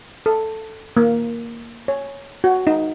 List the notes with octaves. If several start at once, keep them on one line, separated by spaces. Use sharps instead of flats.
A4
A#3
C#5
F#4
D#4